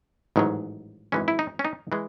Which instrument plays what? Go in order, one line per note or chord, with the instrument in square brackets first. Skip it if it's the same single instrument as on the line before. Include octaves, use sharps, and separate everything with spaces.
[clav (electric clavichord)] A1 G#2 D#3 F#3
G#1 F#2 E3 G#3 C#4
E4
D#4
C#4
D#4
E3 G#3